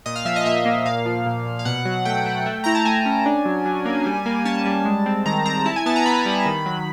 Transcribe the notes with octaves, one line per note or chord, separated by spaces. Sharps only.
A#2 D#5
F5
F3 E5
D#5
A#2 E5
A#3
A#2 F5
F3
A#2
A#2
F5
B2 F#5
F#3
A3 G5
A3
A3
E4 A#5
A5
A3 G#5
C#4
D4
F#3
F#3
A#3
G3
A#3
C#4 A5
G3
G#3
C4
D#3 A#5
C4 A#5
E4 A5
G#5
B3 A5
A#5
B3 B5
G3
D#3
F#3